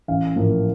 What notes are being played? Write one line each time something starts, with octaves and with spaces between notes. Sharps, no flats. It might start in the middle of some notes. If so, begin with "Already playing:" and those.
A1 F5
A2 F3 A#3